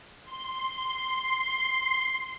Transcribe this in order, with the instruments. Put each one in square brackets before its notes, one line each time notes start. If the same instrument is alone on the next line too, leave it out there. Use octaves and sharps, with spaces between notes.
[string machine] C6 C7